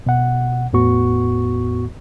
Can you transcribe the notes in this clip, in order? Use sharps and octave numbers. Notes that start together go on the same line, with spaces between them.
B2 F#5
E2 A2 B3 F#4 C#6